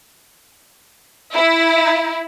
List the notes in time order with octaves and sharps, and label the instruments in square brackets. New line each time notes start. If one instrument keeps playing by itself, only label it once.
[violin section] E4